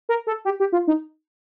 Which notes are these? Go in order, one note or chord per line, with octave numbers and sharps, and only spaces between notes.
A#4
A4
G4
G4
F4
D#4